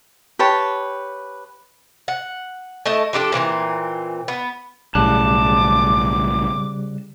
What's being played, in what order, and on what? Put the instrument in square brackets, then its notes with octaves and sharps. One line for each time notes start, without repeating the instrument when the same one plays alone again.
[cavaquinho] G4 B4 C#5 A5
[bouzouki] F#5
A3 E4 D#5 A5
F3 D4 G4 A4
A#2 E3 A3 C4
B3
[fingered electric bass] B1 A2 [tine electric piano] C#3 G3 F#6 [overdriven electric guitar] A5 [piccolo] D6